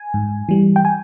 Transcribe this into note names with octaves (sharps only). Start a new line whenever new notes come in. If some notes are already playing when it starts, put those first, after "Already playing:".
Already playing: G#5
G#2
E3 G3
G5
G#5